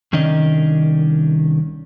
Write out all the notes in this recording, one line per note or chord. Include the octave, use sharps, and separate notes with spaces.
C2 D#3 C#4 D4 D#5